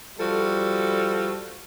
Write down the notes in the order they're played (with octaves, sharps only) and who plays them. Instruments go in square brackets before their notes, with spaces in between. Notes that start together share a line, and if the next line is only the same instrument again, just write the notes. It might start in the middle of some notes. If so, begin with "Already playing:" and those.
[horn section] F3 G3 F#4 A4